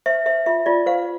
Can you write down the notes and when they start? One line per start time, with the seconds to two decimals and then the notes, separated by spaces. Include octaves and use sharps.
0.06 C5 E5
0.26 C5 E5
0.46 F4 E5
0.66 F4 D5
0.86 C5 F5